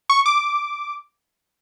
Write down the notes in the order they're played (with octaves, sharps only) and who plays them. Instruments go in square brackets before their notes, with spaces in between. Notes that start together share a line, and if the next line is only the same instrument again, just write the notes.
[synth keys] C#6
D6